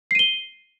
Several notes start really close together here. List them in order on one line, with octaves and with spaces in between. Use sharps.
C7 D#7 G7